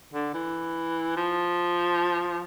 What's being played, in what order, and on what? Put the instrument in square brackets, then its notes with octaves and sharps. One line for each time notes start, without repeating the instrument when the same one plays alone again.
[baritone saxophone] D3
E3
F3